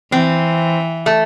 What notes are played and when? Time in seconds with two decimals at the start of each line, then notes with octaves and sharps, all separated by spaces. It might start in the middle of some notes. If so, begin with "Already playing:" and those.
0.12 E3 C4
1.06 A3